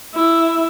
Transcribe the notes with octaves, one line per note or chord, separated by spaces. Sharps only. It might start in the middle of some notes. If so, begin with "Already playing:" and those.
E4